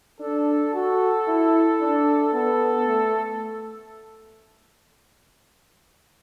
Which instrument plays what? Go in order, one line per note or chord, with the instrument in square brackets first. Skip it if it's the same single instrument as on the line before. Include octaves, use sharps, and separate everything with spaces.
[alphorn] D4 [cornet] A4
[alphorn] F#4 [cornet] A4
[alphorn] E4
D4
[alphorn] B3 [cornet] A4
[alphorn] A3